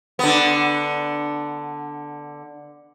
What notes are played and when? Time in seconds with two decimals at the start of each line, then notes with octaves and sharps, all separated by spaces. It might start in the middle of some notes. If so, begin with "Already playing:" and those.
0.19 D3 B3